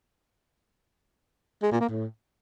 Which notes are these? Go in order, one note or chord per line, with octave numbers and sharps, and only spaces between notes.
G#3
A#2
A#3
A2